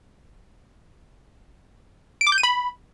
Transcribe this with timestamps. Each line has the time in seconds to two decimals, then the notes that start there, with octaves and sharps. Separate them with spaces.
2.21 D7
2.27 D6
2.32 G6
2.38 D#7
2.43 B5